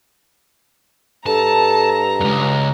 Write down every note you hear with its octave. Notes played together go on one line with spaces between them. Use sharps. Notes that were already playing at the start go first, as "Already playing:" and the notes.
G2 A4 A5 A#5
C#2 F#2